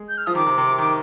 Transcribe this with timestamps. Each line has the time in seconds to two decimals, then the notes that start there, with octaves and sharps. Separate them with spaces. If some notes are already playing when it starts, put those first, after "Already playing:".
Already playing: G#3
0.09 G6
0.18 F6
0.27 F3 D#6
0.35 D#3 D6
0.46 C3
0.58 C3
0.78 D#3